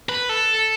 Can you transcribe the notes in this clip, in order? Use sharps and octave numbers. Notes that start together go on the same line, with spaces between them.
B4
A4